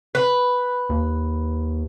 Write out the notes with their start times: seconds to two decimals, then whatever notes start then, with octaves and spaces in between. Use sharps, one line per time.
0.15 B4
0.89 D#2